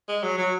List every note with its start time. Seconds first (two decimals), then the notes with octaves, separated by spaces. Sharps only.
0.08 G#3
0.23 F#3
0.38 F#3